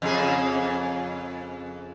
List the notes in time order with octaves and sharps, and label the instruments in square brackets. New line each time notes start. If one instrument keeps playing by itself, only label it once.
[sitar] F2 C#3 G#4